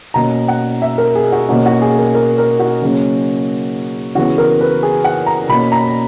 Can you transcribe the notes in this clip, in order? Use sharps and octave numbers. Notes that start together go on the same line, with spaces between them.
B2 A#3 C#4 A#5
F#5
E5
A#4
G#4
F#4
B2 A#3 C#4 F#4
F#4
G#4
A#4
A#4
A#4
F#4
C#3 F#3 A#3 C#4
C#3 E3 B3 F#4
A#4
B4
G#4
F#5
A#5
B2 A#3 C#4 B5
A#5